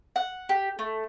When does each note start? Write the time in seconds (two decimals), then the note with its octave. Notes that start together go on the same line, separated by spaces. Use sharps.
0.16 F#5
0.49 G4
0.79 A3